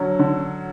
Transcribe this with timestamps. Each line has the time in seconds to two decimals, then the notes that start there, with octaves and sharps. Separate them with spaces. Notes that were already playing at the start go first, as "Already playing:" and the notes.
Already playing: D3 F#3 C#4
0.19 D3